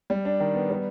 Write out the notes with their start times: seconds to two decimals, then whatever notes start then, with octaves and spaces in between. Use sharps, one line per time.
0.10 G3
0.25 D4
0.40 D#3
0.55 B3
0.70 G3